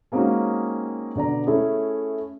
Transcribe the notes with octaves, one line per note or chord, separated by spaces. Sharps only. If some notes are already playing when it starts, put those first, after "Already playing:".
G#3 A#3 C4 C#4 D#4 F#4
B2 D3 D5 A#5
A3 C#4 E4 G#4